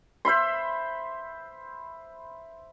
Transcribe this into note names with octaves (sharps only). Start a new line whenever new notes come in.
C5 E5 B5 C6